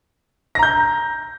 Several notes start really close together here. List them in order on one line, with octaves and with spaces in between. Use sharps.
A#6 A#5 G6